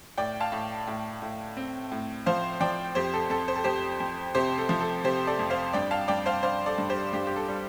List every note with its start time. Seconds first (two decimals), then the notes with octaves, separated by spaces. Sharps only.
0.18 A2 D5 G5
0.40 F5 A5
0.52 A2
0.87 A2
1.22 A2
1.57 C4
1.92 A2
2.26 F3 C5 F5
2.60 F3 D5 G5
2.95 F2 G4 C5
3.14 A4
3.30 F2 A4
3.48 C5
3.56 A4
3.64 F2 G4 C5
4.00 F2
4.35 C3 G4 C5
4.58 A4
4.69 F3
4.80 A4
5.04 C3 G4 C5
5.27 A4 D5
5.39 F2
5.50 C5 F5
5.73 G2 D5 G5
5.91 F5 A5
6.08 G2 D5 G5
6.26 C5 F5
6.43 D4 C5 F5
6.66 A4 D5
6.78 G2
6.89 G4 C5
7.13 G2 G4
7.27 G4
7.36 A4
7.48 G3